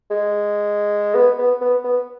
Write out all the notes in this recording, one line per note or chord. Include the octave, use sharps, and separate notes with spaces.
G#3
B3
B3
B3
B3